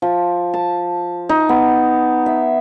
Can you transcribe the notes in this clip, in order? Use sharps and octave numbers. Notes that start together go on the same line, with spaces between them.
F3
A5
D#4
B3
E5